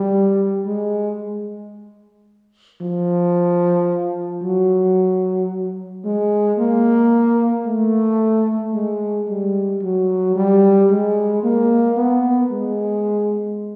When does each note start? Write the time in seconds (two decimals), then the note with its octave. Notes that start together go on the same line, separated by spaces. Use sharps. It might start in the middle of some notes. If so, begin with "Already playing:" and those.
Already playing: G3
0.67 G#3
2.81 F3
4.43 F#3
6.05 G#3
6.59 A#3
7.66 A3
8.74 G#3
9.28 G3
9.82 F#3
10.36 G3
10.90 G#3
11.43 A#3
11.97 B3
12.51 G#3